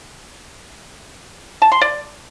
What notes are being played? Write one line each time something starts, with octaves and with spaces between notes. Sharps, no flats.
A5
C6
D5